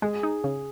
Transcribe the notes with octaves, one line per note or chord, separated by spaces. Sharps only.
G#3 G#4
D#4
C#3